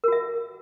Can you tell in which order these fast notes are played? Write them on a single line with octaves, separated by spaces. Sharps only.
A#4 F#4 E5